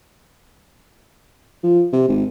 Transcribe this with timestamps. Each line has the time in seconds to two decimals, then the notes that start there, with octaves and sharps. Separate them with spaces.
1.63 F3
1.93 C3
2.08 G#1